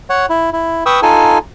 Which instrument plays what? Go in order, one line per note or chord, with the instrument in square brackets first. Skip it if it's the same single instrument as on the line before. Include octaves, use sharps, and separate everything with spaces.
[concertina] C#5 F#5
E4
E4
B4 G5 C#6 D#6 E6
D#4 F4 A4 G#5